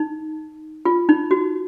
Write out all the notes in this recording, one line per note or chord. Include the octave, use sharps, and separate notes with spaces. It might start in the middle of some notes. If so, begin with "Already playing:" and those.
Already playing: D#4
F4
D#4
F#4